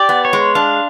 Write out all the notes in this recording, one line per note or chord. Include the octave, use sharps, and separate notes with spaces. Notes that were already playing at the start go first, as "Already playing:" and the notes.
Already playing: G4 D5
B3
C#5
G#3
D4 F5